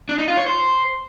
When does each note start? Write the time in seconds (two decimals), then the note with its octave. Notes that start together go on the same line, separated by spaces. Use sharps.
0.09 D4
0.18 D#4
0.28 F4
0.37 C#5
0.46 C5